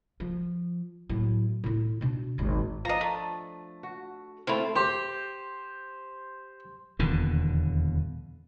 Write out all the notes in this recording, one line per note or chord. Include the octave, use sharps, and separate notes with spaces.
F3
A2 F#3
A2 E4
B2 D4
G#1 D#2
F3 D4 D#5 A#5
A3
F#4
A3 C4 E4 F4 C5
G4 C5
D#1 E2 B2 D3